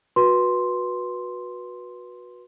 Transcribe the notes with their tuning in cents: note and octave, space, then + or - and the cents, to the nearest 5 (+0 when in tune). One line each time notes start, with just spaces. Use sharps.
F#4 -20 B4 -20 C6 +0